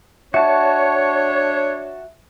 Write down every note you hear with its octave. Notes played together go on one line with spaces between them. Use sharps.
D4 F#4 C#5 E5 A5